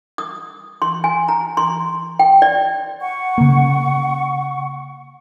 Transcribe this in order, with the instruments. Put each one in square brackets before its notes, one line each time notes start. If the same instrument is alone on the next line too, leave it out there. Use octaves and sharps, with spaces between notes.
[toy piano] D#6
C6
G#5
A#5
C6
G5
D5
[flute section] F#5 C#6
[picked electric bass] C#3 A#3